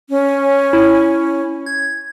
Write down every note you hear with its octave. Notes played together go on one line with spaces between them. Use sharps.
C#4
E4
G#6